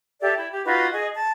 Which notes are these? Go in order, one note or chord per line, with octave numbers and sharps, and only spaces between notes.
G4 A4 D5 E5
E4
G4
D#4 F4 F#4 B4
G#4 D#5
A5